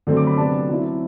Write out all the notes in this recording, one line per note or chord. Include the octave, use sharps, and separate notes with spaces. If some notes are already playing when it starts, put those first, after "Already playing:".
D3 F#3 A3 C4
D6
B5
C3 F#3 B3 D4 A5
F#3 C4 E4